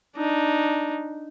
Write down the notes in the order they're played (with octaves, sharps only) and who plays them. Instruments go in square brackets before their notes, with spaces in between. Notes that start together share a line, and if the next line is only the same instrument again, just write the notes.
[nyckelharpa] D4 D#4